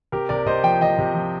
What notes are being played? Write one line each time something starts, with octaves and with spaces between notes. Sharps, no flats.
C3 G4 A#4
C3 A#4 D5
C3 C5 D#5
F3 G5
F3 D#5 G5
C3
F3